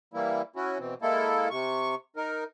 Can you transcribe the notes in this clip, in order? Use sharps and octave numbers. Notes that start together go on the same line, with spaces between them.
E3 G3 A#3 E4
C#4 E4 F#4
B2 E3 C4
G#3 A#3 E4 A4
C3 C#6
D#4 A#4